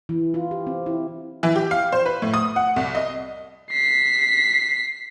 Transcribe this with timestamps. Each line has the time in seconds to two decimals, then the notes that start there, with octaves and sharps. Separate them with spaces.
0.09 E3
0.34 F4
0.51 G4
0.67 C4
0.86 E4
1.43 E3
1.56 G4
1.71 F5
1.92 C5
2.06 B4
2.22 A2
2.34 D#6
2.56 F#5
2.76 C2
2.95 D#5
3.71 B6 C7